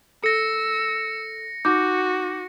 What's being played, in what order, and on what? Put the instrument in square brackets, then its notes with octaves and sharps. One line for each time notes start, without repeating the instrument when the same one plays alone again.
[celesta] A4 [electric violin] E6 [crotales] A#6 C#7
[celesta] D#4 D6 G6 [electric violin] F#4